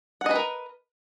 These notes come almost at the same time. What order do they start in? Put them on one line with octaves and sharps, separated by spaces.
F#5 D#5 B4 A#4